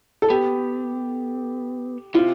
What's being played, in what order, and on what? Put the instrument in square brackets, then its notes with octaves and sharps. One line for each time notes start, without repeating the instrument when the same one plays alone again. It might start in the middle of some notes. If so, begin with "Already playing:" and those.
[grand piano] A4
[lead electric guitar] B3 [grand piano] G4
[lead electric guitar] C3 [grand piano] F4